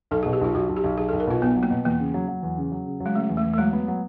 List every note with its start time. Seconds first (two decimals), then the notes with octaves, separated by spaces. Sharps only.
0.11 B1 A4
0.23 G#4
0.26 B2
0.33 G4
0.41 B1 F4
0.55 B1 F#4
0.69 B1
0.76 G4
0.84 B1
0.98 B1 G#4
1.09 A4
1.13 B1
1.20 A#4
1.27 B2 F4
1.42 B1 B3
1.55 F#3
1.63 A#3
1.71 B2
1.85 E2 A#3
2.00 C#3
2.14 F#3
2.28 F#3
2.43 E2
2.58 C#3
2.72 F#3
2.86 C#3
3.00 F#3
3.06 G#3
3.15 C#3 A3
3.29 E2
3.37 A3
3.44 E2
3.53 A3
3.58 F#3 G#3
3.73 B3
3.88 F#3